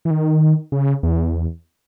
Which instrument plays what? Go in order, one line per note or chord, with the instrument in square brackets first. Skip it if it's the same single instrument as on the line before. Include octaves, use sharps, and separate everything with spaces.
[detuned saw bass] E3
D#3
C#3
E2